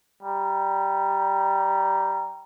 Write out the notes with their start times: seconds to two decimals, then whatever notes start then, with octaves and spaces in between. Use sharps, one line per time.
0.23 G3 A#5